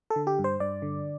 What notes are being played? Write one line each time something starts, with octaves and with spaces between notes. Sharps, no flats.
A4
D3
G4
G2
C5
G2 D5
D3